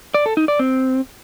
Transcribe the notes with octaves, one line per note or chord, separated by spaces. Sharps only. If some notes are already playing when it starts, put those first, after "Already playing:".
D5
A4
D#4
D5
C4